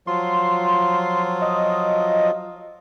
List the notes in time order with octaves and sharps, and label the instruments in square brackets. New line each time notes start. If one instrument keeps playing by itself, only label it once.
[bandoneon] F3 F#3 F4 [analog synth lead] C6
[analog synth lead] D#5